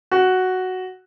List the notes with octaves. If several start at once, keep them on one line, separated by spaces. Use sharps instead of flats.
F#4